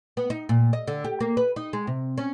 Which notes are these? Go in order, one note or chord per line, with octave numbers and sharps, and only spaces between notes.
B3
D#4
A#2
D#5
D3
G4
A#3
B4
D#4
G#3
C3
C#4